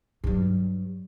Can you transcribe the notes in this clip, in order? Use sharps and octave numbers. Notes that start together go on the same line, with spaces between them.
G2 F#3